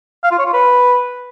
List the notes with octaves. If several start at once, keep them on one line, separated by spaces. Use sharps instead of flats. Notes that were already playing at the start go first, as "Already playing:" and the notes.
F5
F4
C#5
F4
B4